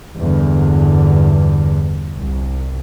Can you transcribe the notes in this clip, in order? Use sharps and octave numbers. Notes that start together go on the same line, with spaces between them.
E2 G2 D3
C2